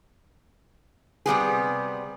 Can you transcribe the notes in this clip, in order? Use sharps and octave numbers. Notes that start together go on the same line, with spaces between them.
C3 G3 B3 G#4